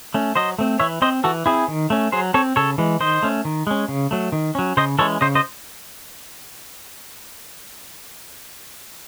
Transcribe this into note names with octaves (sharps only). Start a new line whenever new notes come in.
A3 C#4
F#3 C5 D#5
A3 C4
E3 C#5 E5
C4 C5 D#5
E3 F#4 A4
C4 E4 G#4
D#3
A3 C#4
F#3 G#4 C5
C4 A4 C#5
C#3 A4 C#5
E3 G#3
D#3 C5 D#5
A3 C#4
D#3
G#3 C#4
C#3
F#3 A3
D#3
F#3 C#4
C#3 C5 D#5
E3 G#3 C#4 A4 C#5
C#3 C5 D#5
C5 D#5